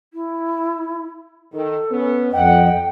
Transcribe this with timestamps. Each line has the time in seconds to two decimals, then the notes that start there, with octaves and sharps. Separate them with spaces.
0.14 E4
1.53 D#3 A4
1.91 B3 C#4
2.33 F2 D#5 F#5 G5